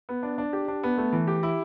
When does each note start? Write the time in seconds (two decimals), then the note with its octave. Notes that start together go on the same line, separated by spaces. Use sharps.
0.09 B3
0.23 D4
0.38 D4
0.53 G4
0.68 D4
0.83 B3
0.98 A3
1.13 E3
1.27 G4
1.43 E4